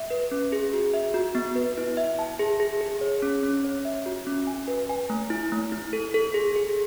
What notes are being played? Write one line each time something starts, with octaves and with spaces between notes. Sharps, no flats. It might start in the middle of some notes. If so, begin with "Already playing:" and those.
Already playing: E5
B4
C#4
G#4
F#4
E5
F#4
B3
B4
E4
E5
A5
G#4
G#4
G#4
C#5
C#4
C#4
C#5
E5
F#4
C#4
G#5
B4
G#5
A3
E4
A3
E4
A4
A4
G#4
G#4